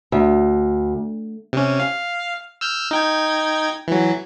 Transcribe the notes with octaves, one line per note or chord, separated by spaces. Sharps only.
D2
C3 C#4
F5
E6 F6 G6
D#4 G5 G#6
E3 F#3